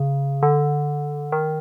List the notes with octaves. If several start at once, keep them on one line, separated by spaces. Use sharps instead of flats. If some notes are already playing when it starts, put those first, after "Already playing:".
Already playing: C#3
D3
D#3